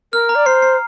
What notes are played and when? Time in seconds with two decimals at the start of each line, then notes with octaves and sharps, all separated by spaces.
0.13 A#4 F6
0.29 A#5
0.35 D5
0.46 C5 C7
0.62 C7